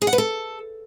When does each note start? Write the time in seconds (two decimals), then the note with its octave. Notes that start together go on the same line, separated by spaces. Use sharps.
0.02 G#4
0.07 F#5
0.13 B4
0.18 A4